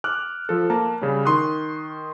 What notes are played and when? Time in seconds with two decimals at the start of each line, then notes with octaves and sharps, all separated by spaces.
0.04 D6 F6 F#6
0.49 F3 A4
0.70 A#3 A5 A#5
1.01 C#3 G3 C#4
1.25 D#3 C6 C#6 D#6 F#6